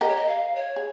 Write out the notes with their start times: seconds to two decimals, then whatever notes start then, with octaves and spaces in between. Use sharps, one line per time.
0.01 G4 A#4 D#5
0.09 C#5
0.16 D#5
0.28 F5
0.55 C#5
0.76 G#4